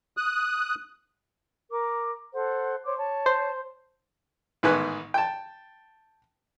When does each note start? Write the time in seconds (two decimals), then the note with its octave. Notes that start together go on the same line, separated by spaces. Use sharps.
0.17 D#6 F#6
1.71 A#4 D6
2.33 A4 C5 F#5
2.84 C5 C#5 D6
2.97 C#5 A5
3.26 C5
4.63 A1 G#2 D#3 B3 G#5 F#6
5.14 G5 A5